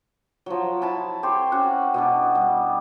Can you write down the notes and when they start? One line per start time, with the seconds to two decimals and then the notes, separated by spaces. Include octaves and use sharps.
0.46 F3 F#3
0.82 E4 A5 B5
1.23 C4 G4 C5 C#5
1.52 C#4 F#4 F#5
1.94 B2 B3 D4
2.35 G3